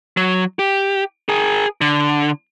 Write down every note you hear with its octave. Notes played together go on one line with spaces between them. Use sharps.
F#3
G4
G#4 A#4
D3